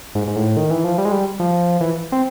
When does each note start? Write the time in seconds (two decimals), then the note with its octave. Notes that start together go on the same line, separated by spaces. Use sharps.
0.15 G#2
0.28 G#2
0.36 A2
0.57 D#3
0.71 E3
0.84 F3
0.98 G3
1.05 G#3
1.12 G3
1.40 F3
1.81 E3
2.12 C4